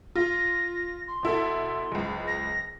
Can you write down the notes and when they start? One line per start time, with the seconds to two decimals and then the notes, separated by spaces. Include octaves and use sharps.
0.15 F4 A#6
1.07 C6
1.23 B2 E4 A4
1.92 F#1 C#2
2.27 A#6